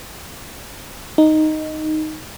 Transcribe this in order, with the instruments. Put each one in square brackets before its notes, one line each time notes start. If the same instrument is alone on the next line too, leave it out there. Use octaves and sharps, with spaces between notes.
[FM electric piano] D#4